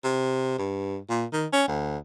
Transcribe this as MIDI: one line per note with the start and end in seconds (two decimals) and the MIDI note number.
0.04 0.56 48
0.58 0.98 43
1.09 1.25 46
1.33 1.46 51
1.53 1.63 61
1.68 1.97 38